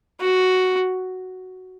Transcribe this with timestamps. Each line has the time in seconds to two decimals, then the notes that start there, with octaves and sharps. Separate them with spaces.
0.21 F#4